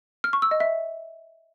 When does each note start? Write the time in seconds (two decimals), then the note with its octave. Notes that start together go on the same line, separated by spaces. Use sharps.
0.24 F6
0.33 C#6
0.42 E6
0.51 D#5
0.60 E5